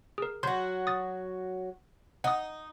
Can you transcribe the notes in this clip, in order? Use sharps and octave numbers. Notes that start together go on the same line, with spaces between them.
G#4 A#4
F#3 F#4 C6 G6
D#6 A6
D#4 F#5 D#6